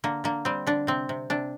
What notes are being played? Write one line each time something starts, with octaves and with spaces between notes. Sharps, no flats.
D3 A#3
D3 A#3
G3 C4
D3 D4
C3 C4
C3
C3 D4